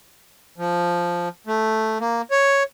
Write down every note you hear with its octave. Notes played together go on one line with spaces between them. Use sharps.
F3
A3
A#3
C#5